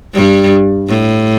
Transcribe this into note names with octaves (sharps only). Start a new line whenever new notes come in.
G2 G3
A2